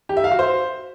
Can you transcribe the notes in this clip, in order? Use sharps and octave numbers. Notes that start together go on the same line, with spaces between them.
G4
E5
F5
F#4
C5